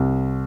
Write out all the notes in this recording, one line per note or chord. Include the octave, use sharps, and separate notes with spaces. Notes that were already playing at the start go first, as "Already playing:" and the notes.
Already playing: C2